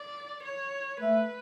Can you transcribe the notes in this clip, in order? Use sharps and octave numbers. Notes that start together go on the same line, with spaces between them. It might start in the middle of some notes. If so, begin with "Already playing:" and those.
Already playing: D5
C#5
A3 B4